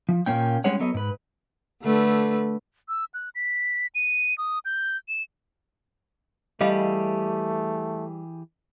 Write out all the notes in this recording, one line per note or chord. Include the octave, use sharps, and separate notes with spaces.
F3
A#2 E3 A#3 C#4 G5
G3 G#3 C#4 G#4 C#5 F#5
F#3 B3 A4 D#5
G#2 B4
D3 A3 B4
E6
F#6
B6
D#7
D#6
G6
E7
E3 G3 A3 G4 G#4 D#5 F5 B5